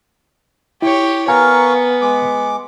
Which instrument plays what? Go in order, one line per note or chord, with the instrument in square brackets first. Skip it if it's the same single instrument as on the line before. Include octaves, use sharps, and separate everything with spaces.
[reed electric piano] E4 [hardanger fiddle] G4 C#5
[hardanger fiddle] B3 [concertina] A#4 F5 C#6 [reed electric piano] G#5 A#5
[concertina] G#3 D6